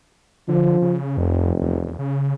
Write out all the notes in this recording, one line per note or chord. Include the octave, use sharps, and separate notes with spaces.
D3 F3
C#3
F1 F2
E2
C#3